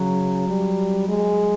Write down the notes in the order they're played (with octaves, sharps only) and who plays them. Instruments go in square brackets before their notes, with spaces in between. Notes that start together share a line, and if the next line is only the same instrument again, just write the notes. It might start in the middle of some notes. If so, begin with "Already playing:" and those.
Already playing: [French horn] C#3 [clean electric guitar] F#3
[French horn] G3
G#3